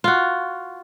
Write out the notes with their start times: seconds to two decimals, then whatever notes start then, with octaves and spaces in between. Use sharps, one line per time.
0.04 F4 F#4